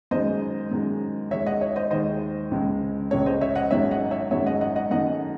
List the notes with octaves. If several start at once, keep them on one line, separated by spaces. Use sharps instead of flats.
F#2 D#3 G#3 C5 D#5
F#2 D#3 G#3
D#2 D#3 G#3 C#5 E5
D#5 F#5
C#5 E5
C5 D#5
D#2 D#3 G#3 C5 D#5
C#2 C#3 G#3
C#2 C#3 G#3 A4 C#5
C5 D#5
C#5 E5
D#5 F#5
G#1 F#2 D#3 G#3 C#5 E5
D#5 F#5
C#5 E5
G#1 F#2 D#3 G#3 C#5 E5
D#5 F#5
D#5 F#5
D#5 F#5
F#2 D#3 A3 D#5 F#5